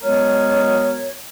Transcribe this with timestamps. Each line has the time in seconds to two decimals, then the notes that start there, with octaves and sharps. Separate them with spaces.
0.02 F#3 G#3 B3 A#4 C#5